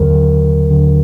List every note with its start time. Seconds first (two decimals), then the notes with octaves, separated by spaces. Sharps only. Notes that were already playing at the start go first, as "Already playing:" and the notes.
Already playing: D#2 D3 F#3 A#4
0.11 D#2 D3 F#3
0.70 D#2 D3 F#3